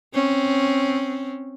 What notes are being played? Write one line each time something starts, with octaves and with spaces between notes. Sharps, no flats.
C4 C#4